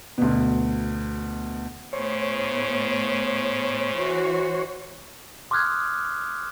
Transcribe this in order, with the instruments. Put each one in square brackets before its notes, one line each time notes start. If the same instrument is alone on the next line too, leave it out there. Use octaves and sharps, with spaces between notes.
[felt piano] D2 B2
[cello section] A2 B3 [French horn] C#3 [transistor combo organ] C5 C#5
[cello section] E3 F#4
[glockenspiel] C6 D6 D#6 F6 F#6 G#6